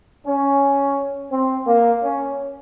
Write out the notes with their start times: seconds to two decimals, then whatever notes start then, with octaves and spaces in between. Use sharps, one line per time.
0.26 C#4
1.32 C4
1.67 A#3
2.03 C#4